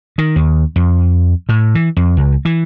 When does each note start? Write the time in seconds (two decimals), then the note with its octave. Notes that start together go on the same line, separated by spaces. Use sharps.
0.18 D#3
0.36 D#2
0.76 F2
1.49 A2
1.75 E3
1.97 F2
2.17 C#2
2.45 E3